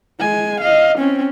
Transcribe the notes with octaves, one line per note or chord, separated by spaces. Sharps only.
G#3 G#5
D#5 F5
C4 C#4